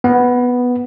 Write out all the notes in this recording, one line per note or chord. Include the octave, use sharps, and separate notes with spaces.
B3